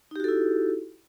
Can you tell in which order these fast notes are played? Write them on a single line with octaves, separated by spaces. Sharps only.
D#4 G4 F#4 A4 E4